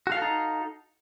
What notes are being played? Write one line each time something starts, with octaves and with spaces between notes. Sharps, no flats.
D#4 F#4 A4 F5